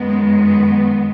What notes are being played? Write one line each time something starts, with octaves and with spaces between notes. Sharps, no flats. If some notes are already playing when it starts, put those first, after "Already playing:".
Already playing: F#2 D#3 G#3 B3
B3